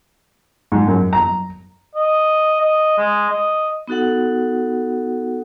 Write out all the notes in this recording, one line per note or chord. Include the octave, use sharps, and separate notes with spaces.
G#2
F#2
A#5
D#5
D#5
G#3
D#5
B3 D#4 F#4 A4 F#5